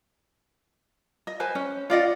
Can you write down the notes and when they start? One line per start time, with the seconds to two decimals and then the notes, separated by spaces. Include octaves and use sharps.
1.27 D#5
1.40 B4 C5 G#5
1.55 C#4
1.90 F4 D5 D#5 F#5